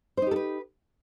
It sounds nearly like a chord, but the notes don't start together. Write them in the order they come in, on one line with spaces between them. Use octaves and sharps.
C5 D#4 G4 A4 B4